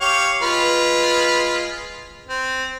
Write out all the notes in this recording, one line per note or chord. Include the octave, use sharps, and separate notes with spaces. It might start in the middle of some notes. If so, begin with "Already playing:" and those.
G4 C#5 F5
G#3 F4 B4
C4